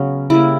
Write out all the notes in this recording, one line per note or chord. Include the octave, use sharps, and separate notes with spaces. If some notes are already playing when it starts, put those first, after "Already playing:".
Already playing: C#3 F#3 B3 C#4
C#3 G3 A#3 E4